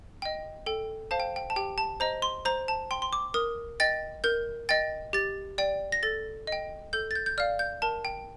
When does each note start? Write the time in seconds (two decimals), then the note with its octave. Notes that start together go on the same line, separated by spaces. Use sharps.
0.22 D#5 G5
0.66 A4 G5
1.11 C5 F5 A5
1.20 G5
1.36 G5
1.50 A5
1.56 G4 G5
1.78 A5
2.00 C5 D#5 A#5
2.22 C6
2.45 C5 A#5
2.68 A5
2.91 G5 C6
3.02 C6
3.13 D6
3.34 A#4 D#6
3.80 D#5 G5 A6
4.24 A#4 G6
4.69 D#5 G5 A6
5.13 G4 A6
5.58 D5 G5
5.92 A#6
6.03 A4 A6
6.47 D#5 G5
6.93 A4 G6
7.11 A6
7.15 G6
7.26 G6
7.38 D5 F5 F6
7.59 G6
7.82 A#4 A5
8.05 G5